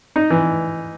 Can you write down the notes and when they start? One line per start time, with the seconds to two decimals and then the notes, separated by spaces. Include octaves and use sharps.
0.16 D#4
0.30 E3